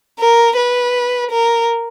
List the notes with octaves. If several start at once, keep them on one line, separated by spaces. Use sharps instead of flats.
A#4
B4
A#4